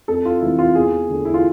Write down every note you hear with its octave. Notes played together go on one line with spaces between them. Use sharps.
F2 A4
F4
C3 E3 A3 E4
F4
E2 G#4
D3 A3
E4
F4